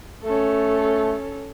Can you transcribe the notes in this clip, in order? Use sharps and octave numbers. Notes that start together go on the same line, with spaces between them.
A3 C#4 A4